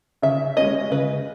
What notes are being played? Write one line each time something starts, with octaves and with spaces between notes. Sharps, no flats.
C#3 E5
G#3 C#4 D#5
C#3 B4